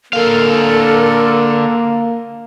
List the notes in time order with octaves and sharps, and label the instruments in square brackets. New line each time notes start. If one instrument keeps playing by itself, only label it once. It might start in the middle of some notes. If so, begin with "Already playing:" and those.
[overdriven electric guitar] D3 F5 [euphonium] A#3 [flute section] A4 A#4